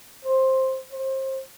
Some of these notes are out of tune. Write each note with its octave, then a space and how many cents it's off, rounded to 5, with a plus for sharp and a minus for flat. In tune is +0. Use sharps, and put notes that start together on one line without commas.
C5 +10
C5 +30